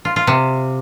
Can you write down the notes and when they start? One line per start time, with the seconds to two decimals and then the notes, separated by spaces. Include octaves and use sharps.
0.05 F4
0.16 F4
0.27 C3